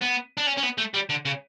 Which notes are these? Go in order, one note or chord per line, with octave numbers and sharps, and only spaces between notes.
B3
D4
C#4
C#4
B3
A3
G3
D3
C#3